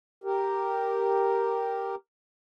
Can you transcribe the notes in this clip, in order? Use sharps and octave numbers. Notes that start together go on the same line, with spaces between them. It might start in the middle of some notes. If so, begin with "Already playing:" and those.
G4 A#4